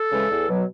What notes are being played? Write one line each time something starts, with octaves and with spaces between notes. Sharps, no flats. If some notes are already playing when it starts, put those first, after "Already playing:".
Already playing: A4
C#3 E3 G#3
E2
B2 F#3